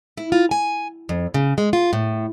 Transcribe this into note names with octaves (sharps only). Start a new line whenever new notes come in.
E4
F4
G#5
F2
C#3
G#3
F4
A2